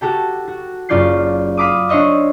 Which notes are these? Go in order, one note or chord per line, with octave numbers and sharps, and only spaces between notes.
F#4 G4 A4 G5
F#4
F#1 C#4 F4 D5 G6 C7
F5 B5 D6 D#6
D4 C5 C#5 D#5 E5